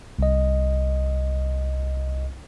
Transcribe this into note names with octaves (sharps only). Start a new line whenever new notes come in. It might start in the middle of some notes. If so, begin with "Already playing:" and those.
C2 D#5